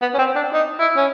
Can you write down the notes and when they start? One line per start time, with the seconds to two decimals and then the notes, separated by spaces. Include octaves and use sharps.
0.02 B3
0.14 C#4
0.19 C4
0.35 D4
0.53 D#4
0.79 E4
0.97 C#4